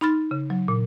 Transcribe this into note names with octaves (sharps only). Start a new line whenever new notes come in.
D#4 B5 C6 F6 A6
C#3
F#3
A#2